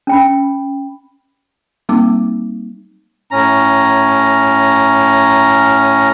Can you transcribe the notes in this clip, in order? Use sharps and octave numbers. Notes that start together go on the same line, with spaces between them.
C#4 G5 B5
G3 A#3 C4 D#4 D6
A2 C#4 A#5